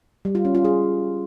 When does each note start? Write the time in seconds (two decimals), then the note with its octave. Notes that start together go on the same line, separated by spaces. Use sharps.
0.25 G3
0.35 F4
0.45 C#4
0.55 F4
0.64 G#4